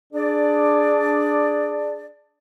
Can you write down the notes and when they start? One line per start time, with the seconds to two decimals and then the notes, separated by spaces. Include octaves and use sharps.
0.13 D4 G#4 D5